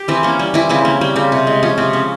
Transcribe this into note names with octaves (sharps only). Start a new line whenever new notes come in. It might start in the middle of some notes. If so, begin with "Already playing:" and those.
Already playing: G4
E3 C4 E4
A#3 C#4
G3
E3 C4 E4
C#3 C4 E4
A#3 C#4
G3 C4
C#3 C4
C3
G#3
F3 C#4
C3 C4
C#3 C#4